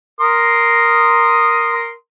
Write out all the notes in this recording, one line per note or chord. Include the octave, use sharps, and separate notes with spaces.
A#4 C6 D#6